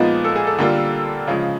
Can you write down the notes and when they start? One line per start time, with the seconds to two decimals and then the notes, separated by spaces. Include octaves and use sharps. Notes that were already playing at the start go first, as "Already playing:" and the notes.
Already playing: A#2 F3 G#3 B3 D#4
0.25 A4
0.36 G#4
0.47 A4
0.59 D3 G3 A#3 D4 F4
1.27 C#3 F3 G#3